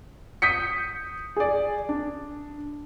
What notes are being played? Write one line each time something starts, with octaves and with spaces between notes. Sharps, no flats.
D#6 G6 B6 C#7
G#4 D5
D4